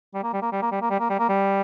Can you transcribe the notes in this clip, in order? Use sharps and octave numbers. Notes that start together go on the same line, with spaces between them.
G3
A#3
G3
A#3
G3
A#3
G3
A#3
G3
A#3
G3
A#3
G3